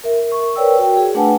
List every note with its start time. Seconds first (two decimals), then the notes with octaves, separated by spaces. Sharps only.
0.04 A#4 E5
0.32 C#6
0.56 A#4 B4 C#5 D5 G5 E6
0.79 F#4 G5
0.97 G#4
1.15 A3 D4 B4 F#5 G#5 A5